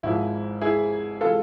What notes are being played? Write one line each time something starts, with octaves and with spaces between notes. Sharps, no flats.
G#1 G#2 F3 E4
E4 G#4
C3 E3 G#3 F4 A4